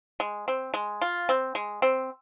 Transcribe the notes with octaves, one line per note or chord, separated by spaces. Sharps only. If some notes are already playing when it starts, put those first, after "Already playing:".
G#3
C4
G#3
F4
C4
G#3
C4